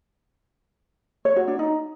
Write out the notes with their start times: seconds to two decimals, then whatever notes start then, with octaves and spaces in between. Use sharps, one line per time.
1.25 C#5
1.36 F#4
1.48 D4
1.59 D#4